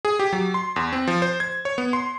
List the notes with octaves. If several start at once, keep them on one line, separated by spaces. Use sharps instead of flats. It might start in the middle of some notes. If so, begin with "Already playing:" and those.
G#4
G4
F#3
C6
E2
C4
F3
C5
G#6
C#5
B3
C6